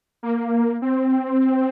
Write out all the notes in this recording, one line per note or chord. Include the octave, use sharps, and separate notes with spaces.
A#3
C4